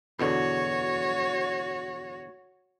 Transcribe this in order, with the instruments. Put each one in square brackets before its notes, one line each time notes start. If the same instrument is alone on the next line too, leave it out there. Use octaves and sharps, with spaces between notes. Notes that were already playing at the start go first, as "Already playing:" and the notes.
[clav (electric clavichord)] E2 B2 D3 [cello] F#4 C#5